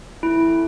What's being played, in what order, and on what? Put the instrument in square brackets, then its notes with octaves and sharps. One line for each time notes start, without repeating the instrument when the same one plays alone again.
[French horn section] C3 E3 A3 [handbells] E4